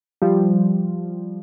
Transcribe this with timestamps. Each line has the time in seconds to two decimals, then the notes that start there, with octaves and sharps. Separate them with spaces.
0.22 F3 G3